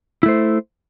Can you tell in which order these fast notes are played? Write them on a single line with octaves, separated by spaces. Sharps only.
E4 A3 C5